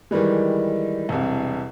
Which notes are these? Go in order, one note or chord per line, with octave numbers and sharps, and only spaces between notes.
D#3 E3 G3 G#3
E1 C2